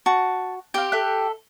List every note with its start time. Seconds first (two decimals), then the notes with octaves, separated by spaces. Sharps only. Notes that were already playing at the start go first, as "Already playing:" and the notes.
0.06 F#4 A5
0.74 C4 G4 F5 G5
0.92 A4 E5 F#6